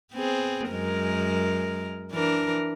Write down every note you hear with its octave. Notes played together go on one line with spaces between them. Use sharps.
B3 C4 G#4
F#2 G#3 A#4
E3 D4 A#4